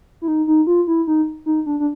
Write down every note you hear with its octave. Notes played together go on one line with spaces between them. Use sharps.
E4
D#4
D#4
F4
E4
D#4
D#4
D4
D4